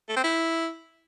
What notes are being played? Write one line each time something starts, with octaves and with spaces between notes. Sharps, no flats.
A3
C4
E4